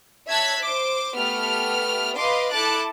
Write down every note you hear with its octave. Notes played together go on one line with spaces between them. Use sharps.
C#5 E5 A5 F#6 G#6 B6
C5 D6
A3 B3 G4 F6
B4 D#5 F5 C6 D6
E4 A4 A5 D6 F#6 A6